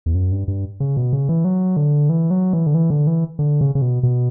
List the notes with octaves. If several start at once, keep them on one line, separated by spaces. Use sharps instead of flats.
E2
F#2
G2
G2
C#3
B2
C#3
E3
F#3
D3
E3
F#3
E3
D3
E3
D3
E3
D3
C#3
C#3
B2
B2